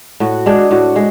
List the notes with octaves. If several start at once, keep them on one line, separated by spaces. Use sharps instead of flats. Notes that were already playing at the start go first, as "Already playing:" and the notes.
A2 F#4
G#3 D4 G#4
A2 F#4
G#3